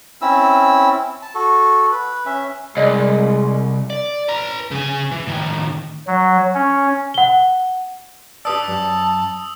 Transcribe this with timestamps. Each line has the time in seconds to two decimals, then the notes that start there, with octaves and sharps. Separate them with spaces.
0.22 C4 C#4 E4 E6
1.22 A5
1.35 F#4 A4
1.91 B4
2.26 C#4 E5
2.77 C2 G#3 D5 D#5
3.90 D5
4.29 B4 A#5
4.71 C#3 G#5
5.11 E3
5.27 A2 D#3
6.07 F#3
6.55 C#4
7.14 F#5 G7
8.45 G4 B4 D5 A5 D#6 E6
8.68 F#2